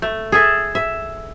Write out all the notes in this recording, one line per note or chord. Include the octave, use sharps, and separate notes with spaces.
A3
G#4 A4 E5
E5